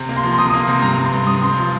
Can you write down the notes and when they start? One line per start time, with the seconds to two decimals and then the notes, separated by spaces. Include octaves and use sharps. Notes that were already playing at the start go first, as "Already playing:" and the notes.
Already playing: C3
0.09 A#3
0.16 C6
0.23 F3
0.32 C6
0.38 C3 D#6
0.46 C6
0.50 D#6
0.53 A#3
0.68 C3 C6
0.82 G2 A#5
0.97 G2
1.05 C6
1.13 G2
1.27 G2 D#6
1.42 G2 C6
1.57 F3